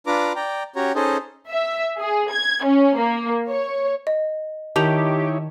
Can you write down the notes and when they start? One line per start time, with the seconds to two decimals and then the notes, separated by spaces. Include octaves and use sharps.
0.07 D4 F4 B4 A#5 D6
0.36 D5 G5 A#5
0.76 C#4 F#4 G4 C#5 A#5
0.95 C#4 D#4 G#4 A4 C5 D#5
1.50 E5
2.00 G#4
2.32 G#6
2.65 C#4
2.98 A#3
3.49 C#5
4.07 D#5
4.76 D#3 D#4 E4 G4 C#5 A5 G6 F7